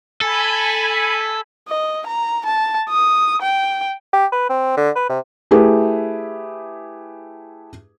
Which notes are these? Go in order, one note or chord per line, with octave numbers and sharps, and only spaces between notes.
A4 G#5 B5
D#5
A#5
A5
D#6
G5
G4
B4
C4
D3
B4
C3
A3 E4 G4 G#4 B4